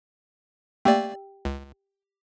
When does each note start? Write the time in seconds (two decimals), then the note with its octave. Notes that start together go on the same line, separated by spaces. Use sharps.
0.85 A3 A#3 G4 D5 G5
1.45 C#2